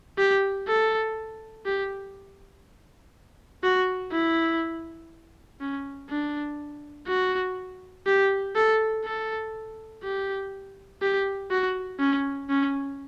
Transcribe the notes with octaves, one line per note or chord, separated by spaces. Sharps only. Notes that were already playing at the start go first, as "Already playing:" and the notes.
G4
A4
G4
F#4
E4
C#4
D4
F#4
G4
A4
A4
G4
G4
F#4
C#4
C#4